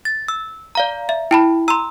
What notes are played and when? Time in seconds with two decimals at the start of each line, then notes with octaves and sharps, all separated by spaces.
0.05 A6
0.28 E6
0.75 D5 F5 A#5
1.09 E5
1.31 E4 G5 A5 B5
1.68 A#5 C6 E6